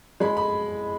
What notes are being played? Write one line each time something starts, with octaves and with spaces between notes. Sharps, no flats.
G#3 B5
B5